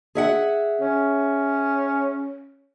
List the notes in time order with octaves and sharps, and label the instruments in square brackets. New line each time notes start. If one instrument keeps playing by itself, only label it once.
[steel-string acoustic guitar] G#4 E5 F#5
[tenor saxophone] C#4